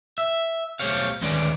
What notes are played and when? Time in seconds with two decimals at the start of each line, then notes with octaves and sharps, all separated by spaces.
0.18 E5
0.79 B1 A3 G4 C5 C#5 F5
1.21 D2 D#3 G#3 C#4 B4 D5